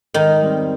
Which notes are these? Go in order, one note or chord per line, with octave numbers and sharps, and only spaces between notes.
G#2 D#3 D#4
G3 C4 G4